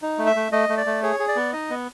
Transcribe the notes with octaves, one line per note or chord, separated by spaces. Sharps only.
D#4
A3
E5
A3
A3 D#5
A3
D5
A3
G#4 C#5
G#4
D5
B3
D#4 D#5
B3